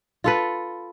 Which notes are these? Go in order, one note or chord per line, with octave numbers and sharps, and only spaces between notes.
F4 A4 B4